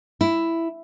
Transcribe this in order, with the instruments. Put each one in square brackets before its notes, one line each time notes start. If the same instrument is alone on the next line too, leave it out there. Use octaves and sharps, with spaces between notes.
[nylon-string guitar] E4